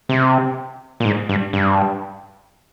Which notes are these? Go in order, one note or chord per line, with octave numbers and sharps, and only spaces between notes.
C3
A#2
G#2
G2
G2